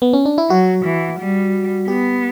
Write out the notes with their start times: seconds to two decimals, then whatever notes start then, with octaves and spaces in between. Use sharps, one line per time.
0.02 B3
0.13 C#4
0.25 D4
0.38 E4
0.50 F#3 F#4
0.85 E3
1.19 G3
1.88 B3 G4